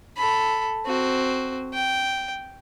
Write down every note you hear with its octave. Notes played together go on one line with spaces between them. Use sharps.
A4 B5
C4 F#4
G5